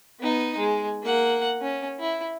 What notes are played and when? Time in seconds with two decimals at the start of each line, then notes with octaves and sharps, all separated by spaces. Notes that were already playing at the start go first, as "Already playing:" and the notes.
0.20 B3 D#4
0.57 G#3
1.03 A#3 F#5
1.61 C#4
1.99 E4